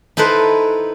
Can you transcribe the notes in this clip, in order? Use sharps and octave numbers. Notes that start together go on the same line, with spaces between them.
D#4 E4 A4 B4 C5